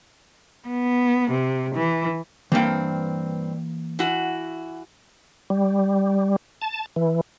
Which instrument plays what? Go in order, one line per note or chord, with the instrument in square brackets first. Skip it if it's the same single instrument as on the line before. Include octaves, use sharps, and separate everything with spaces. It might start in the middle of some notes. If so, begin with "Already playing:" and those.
[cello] B3
C3
E3
[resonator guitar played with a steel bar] G2 C4 [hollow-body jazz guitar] E3 A#3 G5
[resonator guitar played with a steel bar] E3 F#4
[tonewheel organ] G3
A5
E3